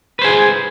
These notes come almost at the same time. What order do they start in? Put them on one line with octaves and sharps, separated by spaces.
B4 C5 G#4